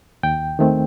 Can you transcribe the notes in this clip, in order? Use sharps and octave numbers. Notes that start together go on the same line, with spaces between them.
D#2 G5
D#3 A3 C4